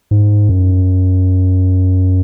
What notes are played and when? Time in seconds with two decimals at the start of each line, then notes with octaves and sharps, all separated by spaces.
0.11 G#2
0.49 F#2